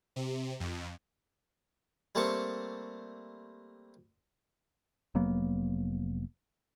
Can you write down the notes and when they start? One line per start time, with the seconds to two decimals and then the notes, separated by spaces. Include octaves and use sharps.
0.16 C3
0.60 F2
2.15 G3 A3 A#3 C4 A5 C#6
5.15 F1 F#3 A#3 B3